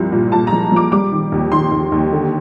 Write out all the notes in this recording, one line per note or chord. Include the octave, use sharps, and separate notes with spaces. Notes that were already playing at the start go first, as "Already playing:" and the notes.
Already playing: C2 G2 F3
A#2
A#2 A5
A#5
F3
F3 D6
G3 D6
D#3
D#2
D#3 C6
D#2
D#2
D3